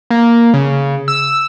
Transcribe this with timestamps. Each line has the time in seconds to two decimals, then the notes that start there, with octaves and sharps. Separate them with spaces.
0.10 A#3
0.54 C#3
1.08 E6